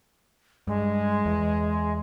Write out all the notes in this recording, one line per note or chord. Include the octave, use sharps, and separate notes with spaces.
G2 G#3
E2